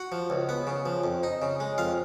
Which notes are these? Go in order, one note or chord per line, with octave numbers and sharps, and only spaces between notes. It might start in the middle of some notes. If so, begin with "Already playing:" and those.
Already playing: F#4 F#5
F3
C#2
B3
C#3
F3
F2
D#4
C#3
G#3
F2 F4 F5